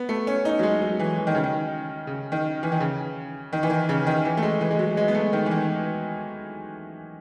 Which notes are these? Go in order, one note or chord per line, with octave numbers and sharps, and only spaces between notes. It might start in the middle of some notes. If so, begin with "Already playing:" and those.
Already playing: B3
A3
C#4
D#4
F#3
G#3
F#3
E3
E3
D#3
C#3
D#3
C#3
D#3
E3
D#3
C#3
D#3
E3
D#3
C#3
D#3
E3
A3
G#3
E3
G#3
F#3
G#3
B3
A3
D#3
E3
D#3